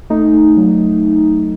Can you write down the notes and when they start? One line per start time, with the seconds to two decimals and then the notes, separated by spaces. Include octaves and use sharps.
0.10 A3 D#4
0.33 A3
0.57 F#3